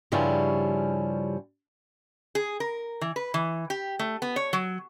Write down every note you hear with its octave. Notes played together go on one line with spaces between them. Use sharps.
G2 C#3 F3 G3 C#4 E4
G#4
A#4
E3
B4
E3
G4
A3
B3
C#5
F#3